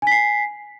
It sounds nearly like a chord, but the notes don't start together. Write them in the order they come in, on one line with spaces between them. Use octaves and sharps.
G#5 B6 C7